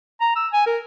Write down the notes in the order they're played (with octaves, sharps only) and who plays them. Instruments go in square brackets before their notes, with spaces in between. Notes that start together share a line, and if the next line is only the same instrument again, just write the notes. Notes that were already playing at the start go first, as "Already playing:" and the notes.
[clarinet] A#5
E6
G#5
A#4